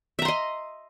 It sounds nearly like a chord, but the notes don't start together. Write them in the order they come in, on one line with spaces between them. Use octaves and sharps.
E5 A#5 C6 D#5